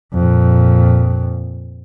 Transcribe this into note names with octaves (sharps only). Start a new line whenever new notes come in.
F2 A#2